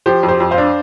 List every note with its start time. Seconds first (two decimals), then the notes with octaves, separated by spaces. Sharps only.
0.06 F3 G4 C5
0.23 F2
0.28 G4 C5
0.40 F2
0.51 C5 F5
0.58 D4